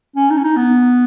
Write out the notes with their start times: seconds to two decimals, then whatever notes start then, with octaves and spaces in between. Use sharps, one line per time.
0.16 C#4
0.30 D#4
0.38 C#4
0.44 D#4
0.57 B3